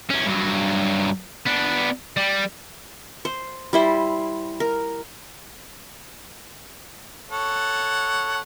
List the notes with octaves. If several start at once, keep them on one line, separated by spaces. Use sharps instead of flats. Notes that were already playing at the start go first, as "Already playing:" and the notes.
E2 C#4
G2 F#3
B3 D4
G3
C5
G3 E4 C5
A#4
A4 C#5 F#5